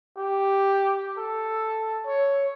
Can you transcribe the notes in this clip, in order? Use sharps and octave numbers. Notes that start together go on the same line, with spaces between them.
G4
A4
C#5